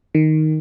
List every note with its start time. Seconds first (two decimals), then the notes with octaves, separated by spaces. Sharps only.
0.15 D#3